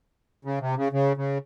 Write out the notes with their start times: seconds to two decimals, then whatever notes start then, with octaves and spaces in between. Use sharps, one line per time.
0.45 C#3
0.61 C3
0.77 C#3
0.92 C#3
1.17 C#3